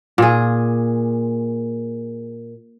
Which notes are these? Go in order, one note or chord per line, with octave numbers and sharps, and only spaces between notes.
A#2 G#4